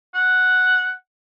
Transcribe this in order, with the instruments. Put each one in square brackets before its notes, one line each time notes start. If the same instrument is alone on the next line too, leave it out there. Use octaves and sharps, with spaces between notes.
[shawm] F#5